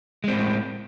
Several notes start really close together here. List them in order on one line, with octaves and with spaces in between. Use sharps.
G#3 C4 A2